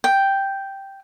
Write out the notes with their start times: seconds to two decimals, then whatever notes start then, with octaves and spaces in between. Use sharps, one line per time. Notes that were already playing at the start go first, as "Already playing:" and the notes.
0.04 G5